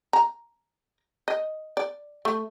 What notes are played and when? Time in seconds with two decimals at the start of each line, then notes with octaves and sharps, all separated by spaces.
0.13 A#5
1.28 D#5
1.77 D5
2.25 A3